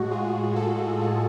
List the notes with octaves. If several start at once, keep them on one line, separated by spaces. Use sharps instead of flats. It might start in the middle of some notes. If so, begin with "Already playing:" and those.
Already playing: A2 G#3 F#4
F4 G#4
F#4 A4
F4 G#4